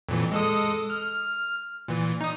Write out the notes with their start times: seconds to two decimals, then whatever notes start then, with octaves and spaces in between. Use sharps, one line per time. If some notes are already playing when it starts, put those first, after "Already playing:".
0.09 F2 A#2 E3
0.32 G#3 A4 D#6
0.90 F6
1.88 A#2 E3
2.21 D#4 D#6